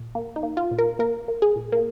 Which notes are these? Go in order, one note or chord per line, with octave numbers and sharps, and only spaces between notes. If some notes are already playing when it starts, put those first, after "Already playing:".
Already playing: A#2
A#3
D#4
A#3
F4
A#2
A#4
A#3 A#4
A#3
G#4
A#2
A#3